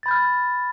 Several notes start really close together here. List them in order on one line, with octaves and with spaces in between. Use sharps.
A6 B5 G6 F6